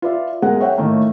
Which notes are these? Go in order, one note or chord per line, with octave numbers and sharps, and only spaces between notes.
F4 B4 D5 E5
B1 G#3 A#4 F#5
C#5 E5 F#5 G5
A2 D#3 A3 A#3